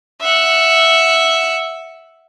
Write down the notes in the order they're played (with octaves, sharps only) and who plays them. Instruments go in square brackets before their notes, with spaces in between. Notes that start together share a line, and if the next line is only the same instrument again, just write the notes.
[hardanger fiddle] E5 F#5